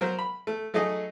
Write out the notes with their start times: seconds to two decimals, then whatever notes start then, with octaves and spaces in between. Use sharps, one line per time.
0.01 F#3 A#4 C5
0.19 B5
0.47 A3
0.74 F#3 A3 D#4 G#4 D#5